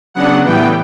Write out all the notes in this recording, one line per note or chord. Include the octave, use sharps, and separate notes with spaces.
C#3 F#3 B3 D4 F#5
A2 E3 G3 B3 G5